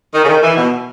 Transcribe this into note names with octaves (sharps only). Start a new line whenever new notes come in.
D#3
C#3
D#3
E3
B2